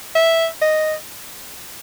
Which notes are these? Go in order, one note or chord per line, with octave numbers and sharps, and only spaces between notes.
E5
D#5